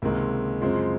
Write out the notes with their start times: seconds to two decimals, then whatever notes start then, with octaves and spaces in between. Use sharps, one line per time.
0.02 C#2 C3 D#3 G#3 A#3
0.62 F#2 C#3 F3 G#3 C4